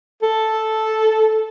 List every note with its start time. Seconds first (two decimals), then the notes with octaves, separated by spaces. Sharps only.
0.23 A4